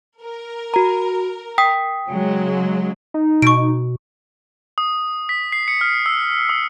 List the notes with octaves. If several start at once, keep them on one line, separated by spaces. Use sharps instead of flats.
A#4
F#4 A#5
G5 D#6 B6
C#3 F#3 G#3
D#4
B2 C#6 D7
D#6
B6
C7
C#7
F6
E6
D#6